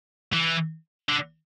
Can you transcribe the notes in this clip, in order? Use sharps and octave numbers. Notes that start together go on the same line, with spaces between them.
E3
D3